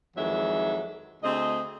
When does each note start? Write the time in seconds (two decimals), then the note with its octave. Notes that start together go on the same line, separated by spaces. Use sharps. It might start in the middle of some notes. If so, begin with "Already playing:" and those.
0.16 F2 D#3 E3 F#3 G#3 E5
1.23 D2 C4 G#4 D#5